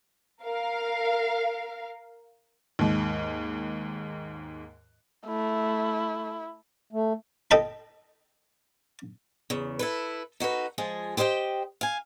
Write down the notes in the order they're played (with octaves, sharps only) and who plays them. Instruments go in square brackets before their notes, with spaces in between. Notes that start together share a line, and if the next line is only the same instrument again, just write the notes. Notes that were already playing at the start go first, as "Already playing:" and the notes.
[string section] A#4 F5
[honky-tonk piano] D#2 G#2
[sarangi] A3 [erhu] E4
[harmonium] A3
[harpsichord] A4 D#5 G5 A5 B5
[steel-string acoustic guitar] E2 C#3
E4 A4 B4
D#4 F#4 A4 B4
F3 G#3 F4 G#4
G4 C5 D#5 F5 G5
F5 G#5